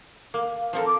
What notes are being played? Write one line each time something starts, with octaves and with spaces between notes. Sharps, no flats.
A#3
F3 C4 A4 A#4
D6